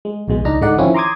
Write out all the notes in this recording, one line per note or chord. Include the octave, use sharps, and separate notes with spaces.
G#3
A#1 D#2 B2 G#3
C#2 D4 D#4 A#5
G#1 D3 G#3 D#4 D5 F#5
D#3 F3 C4 C#4 E4 F4
A#5 C6 D6 D#6 G#6